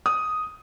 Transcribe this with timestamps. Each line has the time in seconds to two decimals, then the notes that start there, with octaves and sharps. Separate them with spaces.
0.06 D#6